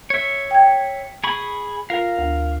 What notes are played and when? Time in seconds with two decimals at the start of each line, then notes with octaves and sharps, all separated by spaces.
0.10 C#5 E5
0.51 G5 G#6
1.24 G#4 B5 C#6
1.90 F4 A#4 F5
2.18 D2